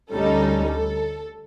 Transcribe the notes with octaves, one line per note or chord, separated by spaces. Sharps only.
D2 G3 C#4 D#4 A4
A4